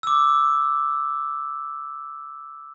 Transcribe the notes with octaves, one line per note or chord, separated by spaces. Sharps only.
D6 E6